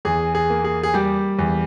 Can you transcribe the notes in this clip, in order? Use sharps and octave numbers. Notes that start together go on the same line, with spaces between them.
E2 G#4
G#4
A#3
G#4
G#4
G3 G4
E2